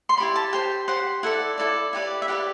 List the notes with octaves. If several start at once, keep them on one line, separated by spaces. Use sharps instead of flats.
C6
E4 G4 D5 B5
A5
G4 C5 G5
G4 C5 F#5
E4 A4 D5 F#5
E4 A4 D5
E4 G4 B4 D5
E5
E4 G4 B4 D5 F#5